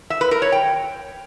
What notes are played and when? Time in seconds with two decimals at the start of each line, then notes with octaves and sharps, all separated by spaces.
0.10 E5
0.21 B4
0.31 A#4
0.42 C#5
0.52 G5